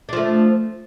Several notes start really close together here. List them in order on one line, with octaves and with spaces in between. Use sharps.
D4 F3 A3